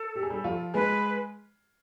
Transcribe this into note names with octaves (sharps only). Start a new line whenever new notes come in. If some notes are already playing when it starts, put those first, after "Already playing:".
Already playing: A4
G4
G#4
G3 G4
F3 F4
G#3 G#4 B4